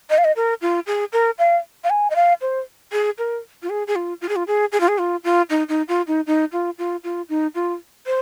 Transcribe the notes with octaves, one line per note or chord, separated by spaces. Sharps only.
D#5
F5
D#5
A#4
F4
G#4
A#4
F5
F5
G#5
D#5
F5
C5
G#4
A#4
F4
G#4
G#4
F4
F4
G#4
F4
G#4
G#4
F4
G#4
F4
F4
D#4
D#4
F4
D#4
D#4
F4
F4
F4
D#4
F4
C5